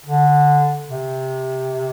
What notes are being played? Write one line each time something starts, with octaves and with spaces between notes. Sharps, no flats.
D3
C3